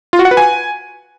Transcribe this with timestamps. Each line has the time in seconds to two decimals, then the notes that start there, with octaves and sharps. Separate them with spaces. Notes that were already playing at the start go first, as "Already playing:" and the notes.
0.13 F4
0.19 F#4
0.25 F#5
0.31 B4
0.37 G#5